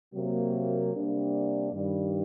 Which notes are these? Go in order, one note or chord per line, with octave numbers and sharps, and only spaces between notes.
C3 F#3 A#3
C3 G3 A#3 D4
G2 D#3 G3